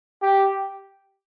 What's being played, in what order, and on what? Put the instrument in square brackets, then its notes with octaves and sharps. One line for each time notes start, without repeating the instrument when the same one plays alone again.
[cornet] G4